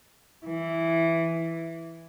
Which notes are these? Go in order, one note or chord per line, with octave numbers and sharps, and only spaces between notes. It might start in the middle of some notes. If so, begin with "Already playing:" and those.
E3